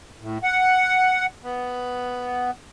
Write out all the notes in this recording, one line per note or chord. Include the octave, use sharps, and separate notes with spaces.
A2
F#5
B3